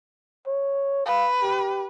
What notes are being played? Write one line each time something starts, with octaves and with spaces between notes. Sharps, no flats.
C#5
B4 F5
G4